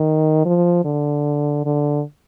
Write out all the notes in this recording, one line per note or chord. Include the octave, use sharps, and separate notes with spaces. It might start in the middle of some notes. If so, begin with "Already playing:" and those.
Already playing: D#3
F3
D3
D3